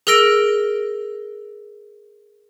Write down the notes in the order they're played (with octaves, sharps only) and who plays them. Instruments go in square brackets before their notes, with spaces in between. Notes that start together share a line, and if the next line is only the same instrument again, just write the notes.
[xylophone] G#4 A#4 E6 A#6 D7